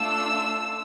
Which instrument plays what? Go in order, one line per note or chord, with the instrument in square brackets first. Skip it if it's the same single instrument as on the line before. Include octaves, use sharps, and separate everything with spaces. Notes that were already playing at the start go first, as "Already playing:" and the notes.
Already playing: [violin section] A3 D4 F4 E6